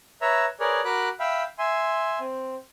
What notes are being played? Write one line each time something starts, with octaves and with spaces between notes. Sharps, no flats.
B4 C#5 E5 A#5
G#4 A#4 B4 C#5 D5
F#4 A#4 B5 D6 F#6
E5 F5 G5 B5
E5 G#5 C6
C4